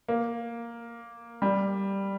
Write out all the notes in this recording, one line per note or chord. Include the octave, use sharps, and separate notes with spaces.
A#3
G3